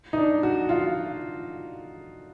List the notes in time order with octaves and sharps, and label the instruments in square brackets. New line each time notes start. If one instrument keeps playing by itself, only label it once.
[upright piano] D#4
D4
F#4
F4